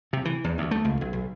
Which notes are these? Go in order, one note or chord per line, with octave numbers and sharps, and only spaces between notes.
C3
E3
E2
D2
A3
C#2
B1
B1